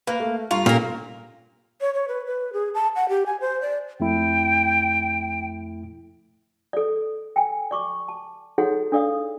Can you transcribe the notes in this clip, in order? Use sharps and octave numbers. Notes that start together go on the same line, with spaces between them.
A#3 B4
A3
G2 F4 A#5 C#6
A#2 A#3 C#4 G4 A4 A#4
C#5
C#5
B4
B4
G#4
A5
F#5
G4
G#5
C5
D5
F2 A3 E4 G5
A4 D5
G5 G#5
D5 C#6 D6
A5
D#4 F#4 G#4 A4 C#5 F#5
D4 A4 D5 F5 D#6